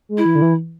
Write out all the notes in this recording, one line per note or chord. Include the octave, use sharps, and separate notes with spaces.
G#3
E4
E3
D3
E3